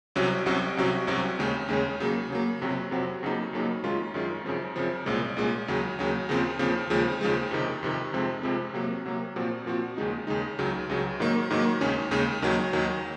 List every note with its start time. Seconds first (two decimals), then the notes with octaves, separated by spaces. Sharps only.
0.16 C2 C3 F#3 C#4 F#4
0.46 C2 C3 F#3 C#4 F#4
0.77 C2 C3 F#3 C#4 F#4
1.07 C2 C3 F#3 C#4 F#4
1.39 D#2 C#3 G#3 C#4
1.69 D#2 C#3 G#3 C#4
2.00 C#3 F#3 A#3
2.30 C#3 F#3 A#3
2.61 F2 C3 F#3 C4 F#4
2.91 F2 C3 F#3 C4 F#4
3.23 F2 C#3 F#3 A#3 D#4
3.53 F2 C#3 F#3 A#3 D#4
3.84 F#2 D#3 G#3 C#4 F4
4.14 F#2 D#3 G#3 C#4 F4
4.45 F#2 C#3 F3 C4
4.76 F#2 C#3 F3 C4
5.06 C2 A#2 G#3 C#4
5.37 C2 A#2 G#3 C#4
5.68 D#2 C#3 F#3
5.99 D#2 C#3 F#3
6.29 D#2 C#3 F3 C4
6.59 D#2 C#3 F3 C4
6.90 D#2 C#3 F3 G#3
7.21 D#2 C#3 F3 G#3
7.51 F2 C3 D#3
7.83 F2 C3 D#3
8.13 F2 C3 F3 G#3 C4
8.43 F2 C3 F3 G#3 C4
8.74 C3 F#3 A#3
9.06 C3 F#3 A#3
9.36 A#2 F3 C4 F#4
9.66 A#2 F3 C4 F#4
9.97 D#2 C#3 G#3 D#4
10.27 D#2 C#3 G#3 D#4
10.59 C#2 C#3 F#3
10.90 C#2 C#3 F#3
11.20 G#2 D#3 F#3 A#3
11.50 G#2 D#3 F#3 A#3
11.81 D#2 C#3 G#3 C#4
12.11 D#2 C#3 G#3 C#4
12.42 D#2 D#3 F#3
12.73 D#2 D#3 F#3